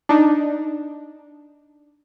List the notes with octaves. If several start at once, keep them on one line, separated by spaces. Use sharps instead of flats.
D4 D#4